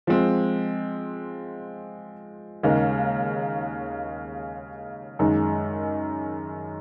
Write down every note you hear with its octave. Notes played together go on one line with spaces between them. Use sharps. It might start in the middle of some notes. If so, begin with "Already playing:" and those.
F3 G#3 C4
D#2 C#3 G#3 D#4 A#4
F#2 D#3 G#3 D#4